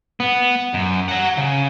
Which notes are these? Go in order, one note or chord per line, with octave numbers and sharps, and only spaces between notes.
B3
F#2
F#5 A#5
C#3